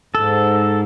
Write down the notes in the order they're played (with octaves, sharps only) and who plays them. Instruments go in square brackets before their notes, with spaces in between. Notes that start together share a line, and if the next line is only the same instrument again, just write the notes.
[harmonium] G#2 [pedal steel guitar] A4